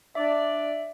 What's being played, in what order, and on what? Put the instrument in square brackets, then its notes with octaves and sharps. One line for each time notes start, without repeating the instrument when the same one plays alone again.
[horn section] D4 D5 [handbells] E5